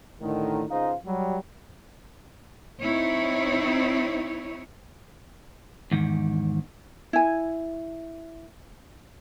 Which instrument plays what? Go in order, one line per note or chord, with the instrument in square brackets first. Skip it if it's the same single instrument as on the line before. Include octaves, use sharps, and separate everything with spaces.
[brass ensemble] A2 D3 D#3
C#2 G#3 D#4 C5 F5
F#3 G3
[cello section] C4 D#4 E4 C#5
[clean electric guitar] E2 G#2 D#3
[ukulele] E4 G#5